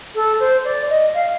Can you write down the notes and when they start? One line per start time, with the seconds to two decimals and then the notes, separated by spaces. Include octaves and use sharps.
0.15 A4
0.40 C5
0.65 D5
0.90 D#5
1.14 F5